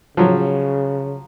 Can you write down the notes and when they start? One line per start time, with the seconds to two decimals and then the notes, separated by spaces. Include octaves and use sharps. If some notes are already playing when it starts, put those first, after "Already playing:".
0.17 C#3 F3 F#3